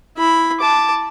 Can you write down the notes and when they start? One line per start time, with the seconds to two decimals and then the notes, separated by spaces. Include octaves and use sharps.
0.17 E4 B5
0.60 A5 D6